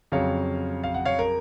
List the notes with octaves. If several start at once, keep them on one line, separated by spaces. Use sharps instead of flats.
F2 C#3 F#3 C#5 F5
F5
F#5
C#5 F5
A#4